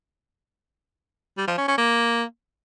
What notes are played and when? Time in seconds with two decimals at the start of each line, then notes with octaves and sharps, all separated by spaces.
1.37 G3
1.47 F3
1.58 C#4
1.68 C#4
1.78 A#3